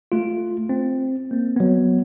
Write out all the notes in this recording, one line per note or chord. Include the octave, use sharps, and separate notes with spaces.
A3 F4
C4
A#3 C4
F#3 B3